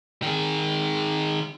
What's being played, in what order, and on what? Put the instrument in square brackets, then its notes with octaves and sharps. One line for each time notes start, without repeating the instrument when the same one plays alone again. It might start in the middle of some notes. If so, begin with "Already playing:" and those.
[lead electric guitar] D#3 G#4